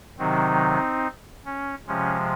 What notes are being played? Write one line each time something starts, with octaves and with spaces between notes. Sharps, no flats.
C3 D#3 F#3 C4 D#4
C#4
C3 F3 G#3 C#4